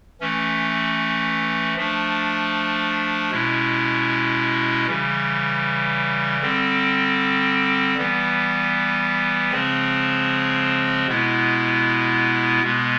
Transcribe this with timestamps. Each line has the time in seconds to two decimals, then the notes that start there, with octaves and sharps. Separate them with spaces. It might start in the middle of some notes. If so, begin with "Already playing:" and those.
0.20 E3 A3 C#4
1.76 F3 A3 D4
3.31 B2 G#3 C#4 E4
4.86 C#3 E3 G3
6.41 D3 G3 C4
7.97 E3 G3 B3
9.52 C#3 F3 G#3 C4
11.07 B2 G#3 B3 E4
12.63 B2 G#3 B3